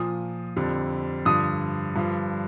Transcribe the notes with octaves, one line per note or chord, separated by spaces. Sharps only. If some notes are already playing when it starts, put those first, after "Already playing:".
Already playing: A#2 F3 D#6
F2 D3 G3
G2 D3 F3 D#6
G2 D3 F3